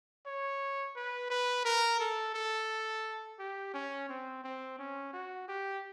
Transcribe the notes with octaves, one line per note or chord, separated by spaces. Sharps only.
C#5
B4
B4
A#4
A4
A4
G4
C#4
C4
C4
C#4
F#4
G4